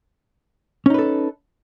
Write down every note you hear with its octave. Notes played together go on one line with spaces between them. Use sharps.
C#4 D#4 A4 B4